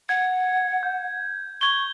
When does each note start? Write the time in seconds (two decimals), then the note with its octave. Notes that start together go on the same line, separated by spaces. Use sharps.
0.09 F#5 G#6
0.83 G6
1.61 C#6 G#6 G7